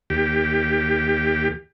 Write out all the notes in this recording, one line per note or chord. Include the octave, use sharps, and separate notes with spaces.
D#2 G4